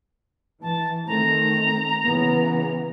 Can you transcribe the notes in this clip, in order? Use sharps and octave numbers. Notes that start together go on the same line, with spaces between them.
E3 A5
D#3 A3 C4 A#5
C#3 E3 B3